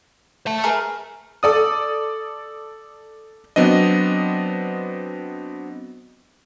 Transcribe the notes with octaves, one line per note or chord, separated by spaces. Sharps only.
E5 A5
G#4 A#4 B4
A4 D5 D#6
F#3 B3 C4 D4 D#5